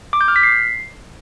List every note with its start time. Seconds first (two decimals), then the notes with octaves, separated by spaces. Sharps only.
0.13 D6
0.21 G6
0.28 F6
0.36 B6
0.43 C7